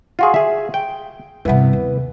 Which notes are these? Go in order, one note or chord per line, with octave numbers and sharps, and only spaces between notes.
F4 F#4 G#4
G#4 E5
G5
G2 C3 E3 B3
D#2